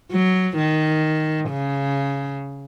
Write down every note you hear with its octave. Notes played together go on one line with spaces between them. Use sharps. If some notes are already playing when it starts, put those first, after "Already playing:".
F#3
D#3
C#3